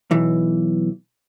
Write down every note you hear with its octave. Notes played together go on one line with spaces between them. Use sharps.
B1 E3